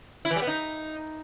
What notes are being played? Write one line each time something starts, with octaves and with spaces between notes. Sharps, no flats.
E4
E3
G3
B3
D#4